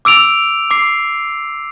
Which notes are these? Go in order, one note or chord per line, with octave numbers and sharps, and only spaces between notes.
D6 E6 D7 F7
D6 C7